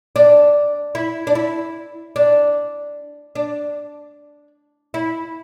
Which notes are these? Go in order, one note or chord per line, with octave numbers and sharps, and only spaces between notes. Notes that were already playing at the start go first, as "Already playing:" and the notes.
D4
E4
D4
E4
D4
D4
E4